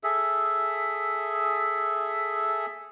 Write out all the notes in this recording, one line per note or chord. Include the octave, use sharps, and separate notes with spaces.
G#4 A4 E5